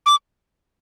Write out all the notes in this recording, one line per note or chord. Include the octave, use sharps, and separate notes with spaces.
D6